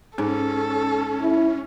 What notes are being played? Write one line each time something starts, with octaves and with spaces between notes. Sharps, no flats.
G#2 C#4 A4
E4